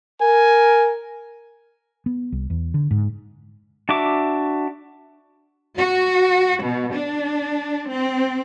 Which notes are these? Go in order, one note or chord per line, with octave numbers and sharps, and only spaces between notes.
A#4 G#5
B3
C2
E2
D3
G#2
D4 F#4 E5 D6
F#4
B2
D4
C4